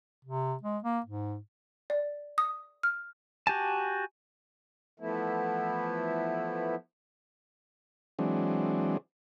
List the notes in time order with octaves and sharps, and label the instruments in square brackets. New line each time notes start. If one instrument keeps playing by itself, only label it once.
[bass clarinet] C3
G#3
A#3
G#2
[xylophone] D5
D#6
F6
[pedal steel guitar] F#4 G4 G#5 A5
[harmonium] E3 F3 A3 B3 E4
[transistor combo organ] E3 F#3 G#3 C4 D4